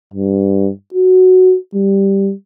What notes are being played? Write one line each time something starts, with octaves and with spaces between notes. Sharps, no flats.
G2
F#4
G3